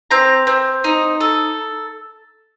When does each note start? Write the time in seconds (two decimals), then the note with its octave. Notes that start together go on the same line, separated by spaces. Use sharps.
0.11 C4 A#5
0.47 C4
0.84 D#4
1.20 A4